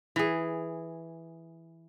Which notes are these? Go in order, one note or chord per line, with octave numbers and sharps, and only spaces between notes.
E3 G#4